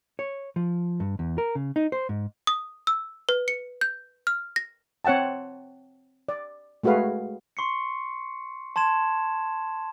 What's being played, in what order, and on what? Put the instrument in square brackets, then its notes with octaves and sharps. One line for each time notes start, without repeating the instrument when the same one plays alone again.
[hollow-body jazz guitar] C#5
F3
G2
E2
A#4
C#3
D#4
C5
G#2
[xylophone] D#6
E6
B4
C#7
G6
F6
A#6
[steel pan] C4 C#5 F#5 G5 A5
D5
G#3 A3 F#4 G#4 B4 F5
[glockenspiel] C6 C#6 C7 C#7
A5 C6 G#6 E7